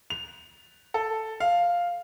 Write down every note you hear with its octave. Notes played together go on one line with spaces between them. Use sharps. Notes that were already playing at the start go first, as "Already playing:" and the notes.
F7
A4
F5